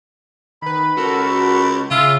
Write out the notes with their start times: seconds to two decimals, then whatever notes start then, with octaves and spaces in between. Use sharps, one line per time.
0.62 D#3 B4 B5
0.97 C#2 F#4 A4 A#4
1.91 C#3 F4 E5 F5